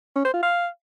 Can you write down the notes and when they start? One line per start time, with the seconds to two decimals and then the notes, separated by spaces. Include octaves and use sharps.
0.16 C#4
0.25 C5
0.34 F4
0.42 F5